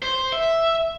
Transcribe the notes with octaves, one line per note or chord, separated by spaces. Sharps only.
C5
E5